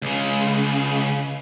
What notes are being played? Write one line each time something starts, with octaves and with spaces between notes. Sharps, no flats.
C#2 C#3